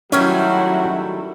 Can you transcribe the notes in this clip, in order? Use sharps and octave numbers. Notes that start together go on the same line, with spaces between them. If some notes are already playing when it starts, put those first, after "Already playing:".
D#3 F#3 G3 A3 C#4 E4 F#4